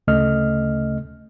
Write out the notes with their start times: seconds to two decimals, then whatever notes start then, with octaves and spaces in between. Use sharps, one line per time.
0.08 D2 C#3 A3 C#4 D#5 F6